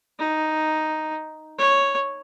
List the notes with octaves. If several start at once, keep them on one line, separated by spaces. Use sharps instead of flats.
D#4
C#5